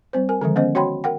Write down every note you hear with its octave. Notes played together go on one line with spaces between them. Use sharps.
G3 C4 C5
A#4 G#5
D3 D#3 F3 G#3
B3 C#4 C5 D#5
F#4 C#5 F#5 G5 B5 C6
A#4 F#5 G5